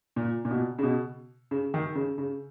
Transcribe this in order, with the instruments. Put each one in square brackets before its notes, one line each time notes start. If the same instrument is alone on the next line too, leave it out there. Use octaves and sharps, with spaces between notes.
[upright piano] A#2
A#2
B2
C#3
B2
C#3
D#3
C#3
C#3